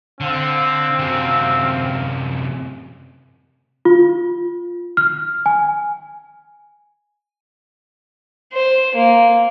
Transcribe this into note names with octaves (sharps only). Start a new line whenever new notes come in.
D3 C4 F5
F#2 C3
F4
F6
G#5
C5
A#3